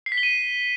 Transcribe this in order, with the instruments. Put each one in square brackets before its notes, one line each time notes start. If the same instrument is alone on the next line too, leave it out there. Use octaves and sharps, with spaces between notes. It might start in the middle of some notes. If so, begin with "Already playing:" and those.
[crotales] C7
B6
G7
D#7